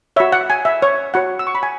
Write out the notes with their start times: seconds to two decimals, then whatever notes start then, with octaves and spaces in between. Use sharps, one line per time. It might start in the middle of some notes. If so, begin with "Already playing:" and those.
0.16 F#4 C#5 E5
0.32 F#5
0.50 G#5
0.65 E5
0.82 C#5
1.14 F#4 C#5 F#5
1.39 E6
1.47 C#6
1.55 B5
1.63 G#5